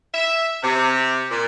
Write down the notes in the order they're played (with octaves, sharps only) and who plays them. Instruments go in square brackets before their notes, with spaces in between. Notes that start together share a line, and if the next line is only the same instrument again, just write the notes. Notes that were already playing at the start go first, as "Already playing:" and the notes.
[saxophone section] E5
C3
A#2